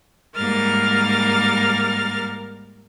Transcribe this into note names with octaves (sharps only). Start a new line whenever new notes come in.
G#2 G3 A#3 A#4 F6 A6